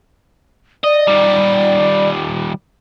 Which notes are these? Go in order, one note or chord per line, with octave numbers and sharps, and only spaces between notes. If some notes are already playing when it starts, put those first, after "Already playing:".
D5 D#5
D#3 G3